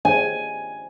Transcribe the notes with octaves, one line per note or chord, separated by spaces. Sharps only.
G#5